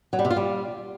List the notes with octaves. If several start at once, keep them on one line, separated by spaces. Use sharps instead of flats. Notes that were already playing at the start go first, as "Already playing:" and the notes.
F#3
G3
C3
F4
G3